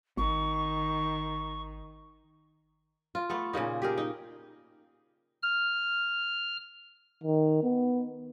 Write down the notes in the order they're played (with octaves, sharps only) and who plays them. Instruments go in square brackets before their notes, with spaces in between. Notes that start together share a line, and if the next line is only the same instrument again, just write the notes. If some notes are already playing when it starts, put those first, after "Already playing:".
[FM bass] G#1 [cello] D#3 [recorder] C#6
[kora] F4
A3 B3 A4
A#2 C#3 A#3 D#4
G4 G#4 A#4
D#4
[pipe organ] F6
[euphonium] D#3
B3